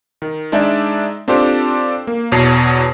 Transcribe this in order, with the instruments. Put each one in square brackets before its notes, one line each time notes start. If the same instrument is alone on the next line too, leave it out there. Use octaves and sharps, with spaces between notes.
[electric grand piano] D#3
G#3 D4 D#4 D5 E5
C4 D4 F4 G4 A4 C5
A#3
E2 B2 C#5 A5 C7